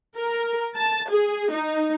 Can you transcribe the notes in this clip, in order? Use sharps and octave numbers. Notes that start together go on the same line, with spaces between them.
A#4
A5
G#4
D#4